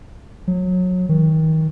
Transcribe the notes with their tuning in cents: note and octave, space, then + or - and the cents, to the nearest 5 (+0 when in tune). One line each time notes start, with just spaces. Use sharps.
F#3 -25
D#3 +30